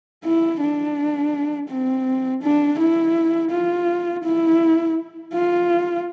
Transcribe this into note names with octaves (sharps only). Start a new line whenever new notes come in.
E4
D4
C4
D4
E4
F4
E4
F4